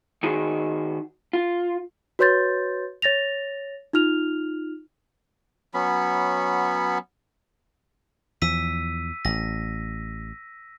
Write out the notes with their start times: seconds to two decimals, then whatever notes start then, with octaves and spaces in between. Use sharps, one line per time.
0.23 D#3 D#4 F#4 G#4
1.33 F4
2.19 F#4 B4 C#5 C6 G6 A6
3.02 C#5 A6 A#6 F7
3.93 D#4 F4 F6 F7
5.74 F#3 B3 C#4 B5
8.42 E2 F3 E6 B6 D#7
9.25 A1 A#6